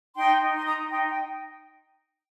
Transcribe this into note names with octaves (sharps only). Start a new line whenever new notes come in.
D#4 G5 C6
D#4
C6
D#4 A#5 D#6
D#4 G5 C6
G5